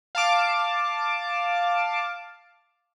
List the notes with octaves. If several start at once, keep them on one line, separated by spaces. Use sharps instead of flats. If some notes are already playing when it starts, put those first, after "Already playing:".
F5 A5 D6